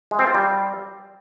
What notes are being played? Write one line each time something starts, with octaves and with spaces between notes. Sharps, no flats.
G#3
C4
F4
G3